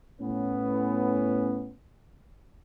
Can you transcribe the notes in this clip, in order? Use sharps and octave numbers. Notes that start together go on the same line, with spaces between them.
A2 B3 C#4